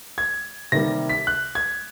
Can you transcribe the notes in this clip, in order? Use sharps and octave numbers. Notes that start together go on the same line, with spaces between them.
G#6
C3 D#3 G3 A#3 A#6
B6
F#6
G#6